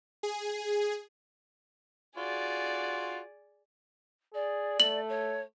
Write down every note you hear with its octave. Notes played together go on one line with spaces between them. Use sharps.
G#4
F4 F#4 G#4 D5
G#4 D5
A3 F#7
C#5